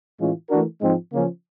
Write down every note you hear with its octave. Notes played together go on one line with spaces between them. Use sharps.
A2 E3 G#3 C#4 F4
E3 A3 D4 F#4 A#4
G#2 F3 G#3 C4 D#4
C#3 F3 A#3 C#4